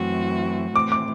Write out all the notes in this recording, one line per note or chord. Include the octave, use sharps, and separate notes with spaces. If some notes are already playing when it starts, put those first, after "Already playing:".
Already playing: F#2 E3 A3 C4 F#4
A2 E3 A3 C4 D6
D6